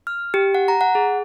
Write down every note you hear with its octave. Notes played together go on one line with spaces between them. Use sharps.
F6
G4
F#5
A#5
F#5
G#4